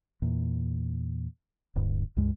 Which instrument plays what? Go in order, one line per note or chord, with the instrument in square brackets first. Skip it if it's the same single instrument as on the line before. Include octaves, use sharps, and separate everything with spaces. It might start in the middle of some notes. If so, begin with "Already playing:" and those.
[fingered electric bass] E2 A#2
D1 D2 G2
C#2 G2 G#3